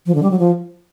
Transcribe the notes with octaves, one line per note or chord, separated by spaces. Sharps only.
F3
D3
G3
F#3
F3